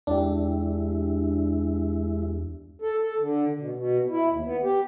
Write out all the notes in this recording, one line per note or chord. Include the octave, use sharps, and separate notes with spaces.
E2 G#3 D4 E4 G4
A4
A4
D3
B2
B2
E4
D#2
B3
G4